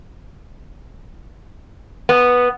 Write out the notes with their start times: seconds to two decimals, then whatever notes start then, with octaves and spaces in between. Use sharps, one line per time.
2.09 B3